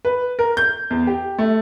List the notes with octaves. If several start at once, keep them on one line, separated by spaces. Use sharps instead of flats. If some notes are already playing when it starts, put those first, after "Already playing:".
B4
A#4
G6
E2
G4
A3